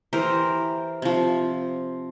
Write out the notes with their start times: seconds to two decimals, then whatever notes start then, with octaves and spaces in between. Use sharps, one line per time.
0.13 E3 G4 A#4 C5
1.02 C3 F3